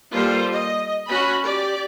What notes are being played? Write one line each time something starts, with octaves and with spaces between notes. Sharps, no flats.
G3 A#3 F4 A4 C5
D#5
C#4 F#4 B5
G4 D5